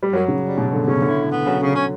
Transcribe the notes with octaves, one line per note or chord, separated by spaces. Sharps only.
G3
F#2 F#3
F#2 C#3
G3
G2 B2
G2 D3
C#3 C#4
D3 E4
A2
B3
C#3 F#3
C#3
C#4